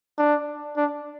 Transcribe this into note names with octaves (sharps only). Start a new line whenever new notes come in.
D4
D4